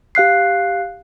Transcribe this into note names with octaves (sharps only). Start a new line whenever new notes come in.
G4 F5 F#6 C7